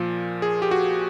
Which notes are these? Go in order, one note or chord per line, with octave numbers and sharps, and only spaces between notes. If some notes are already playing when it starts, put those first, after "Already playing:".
Already playing: A#2 F3
G#4
G4
F#4